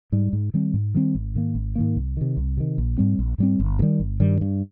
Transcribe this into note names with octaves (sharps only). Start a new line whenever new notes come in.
G#2 G3
G#2
D#3 G3 C4
G#2
D#3 G3 C4
G#1
G#2 D#3 A#3
G#1
G#2 D#3 A#3
C2
C3 D#3
C2
C3 D#3
A#1
G#2 G3 C4
A#1
G#2 G3 C4
G1
G2
D#3 G3
G1
G2 D#3 G3
G2